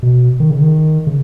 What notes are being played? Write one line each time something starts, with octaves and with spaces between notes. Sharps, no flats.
B2
D#3
C#3
D#3
C#3